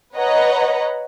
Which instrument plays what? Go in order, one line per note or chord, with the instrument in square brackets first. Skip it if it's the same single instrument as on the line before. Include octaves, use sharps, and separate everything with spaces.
[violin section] B4 C#5 D#5 F#5 A#5